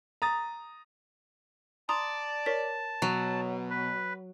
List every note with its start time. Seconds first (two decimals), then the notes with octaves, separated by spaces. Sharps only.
0.22 A#5 D#6 A6
1.89 D5 A5 A#5 C6 D#6
2.46 A#4 C#5 B6
3.02 B2 F#3
3.70 B4